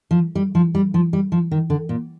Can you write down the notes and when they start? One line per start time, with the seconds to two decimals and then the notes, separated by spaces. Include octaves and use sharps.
0.11 F3
0.35 G3
0.55 F3
0.75 G3
0.94 F3
1.13 G3
1.32 F3
1.51 D#3
1.70 D3
1.89 A#2